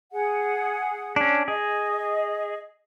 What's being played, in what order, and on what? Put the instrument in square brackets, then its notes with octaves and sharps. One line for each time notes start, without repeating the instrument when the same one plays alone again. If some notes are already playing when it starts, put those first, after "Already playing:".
[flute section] G#4 F#5
[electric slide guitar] C#4 D4
[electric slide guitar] G#4 [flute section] D#5